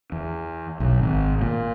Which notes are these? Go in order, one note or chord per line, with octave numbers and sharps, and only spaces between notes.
E2
B1
G#1
A#2